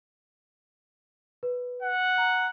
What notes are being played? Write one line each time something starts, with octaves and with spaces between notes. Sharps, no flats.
B4
F#5
A#5